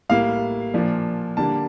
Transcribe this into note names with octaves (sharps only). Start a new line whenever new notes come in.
A2 G3 A#3 F5
A#2 F3 A#3 D4
D3 G3 A#3 D4 A5